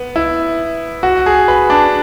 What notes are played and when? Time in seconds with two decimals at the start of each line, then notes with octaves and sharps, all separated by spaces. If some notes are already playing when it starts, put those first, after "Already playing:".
Already playing: B3
0.16 E4
1.03 F#4
1.26 G#4
1.48 B4
1.70 D4